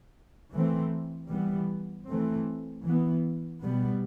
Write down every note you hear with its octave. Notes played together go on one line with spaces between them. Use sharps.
E3 A3 C4
E3 G3 B3
E3 A3 C4
E3 B3
B2 G3 B3